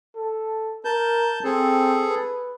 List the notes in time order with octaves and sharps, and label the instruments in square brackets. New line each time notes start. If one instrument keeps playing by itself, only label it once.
[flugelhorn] A4
[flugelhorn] A#4 [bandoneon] A5 G6
[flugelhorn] C4 [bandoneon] G#4 A4
[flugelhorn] B4